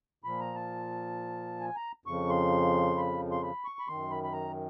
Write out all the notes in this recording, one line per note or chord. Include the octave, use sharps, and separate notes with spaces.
A#2 F3 B5
A#5
A5
G#5
A#5
F2 C#3 F3 C#6
C6
B5
C6
B5
C#6
B5
F#2 D#3 C6
B5
B5
A#5